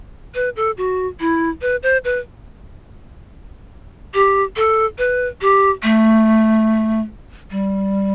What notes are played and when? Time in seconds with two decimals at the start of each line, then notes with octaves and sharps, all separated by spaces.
0.35 B4
0.56 A4
0.78 F#4
1.20 E4
1.62 B4
1.83 C5
2.04 B4
4.14 G4
4.56 A4
4.98 B4
5.41 G4
5.83 A3
7.51 G3